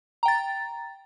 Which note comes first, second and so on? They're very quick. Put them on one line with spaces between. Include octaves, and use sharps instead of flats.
A#5 G5 A6